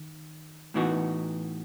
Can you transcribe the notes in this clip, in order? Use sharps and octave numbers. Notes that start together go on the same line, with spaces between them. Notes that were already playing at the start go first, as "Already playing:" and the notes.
Already playing: D#3
A2 E3 B3 D#4 F#4